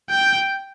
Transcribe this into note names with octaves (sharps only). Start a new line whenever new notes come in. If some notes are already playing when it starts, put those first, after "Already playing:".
G5